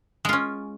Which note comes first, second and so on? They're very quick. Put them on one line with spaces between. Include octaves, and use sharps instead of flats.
G#3 F4 C#4